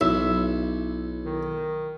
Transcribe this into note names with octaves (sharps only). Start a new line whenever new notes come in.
B1 E4 E5
D#3